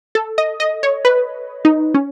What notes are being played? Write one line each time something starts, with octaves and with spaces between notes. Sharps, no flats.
A4
D#5
D#5
C#5
B4
D#4
C#4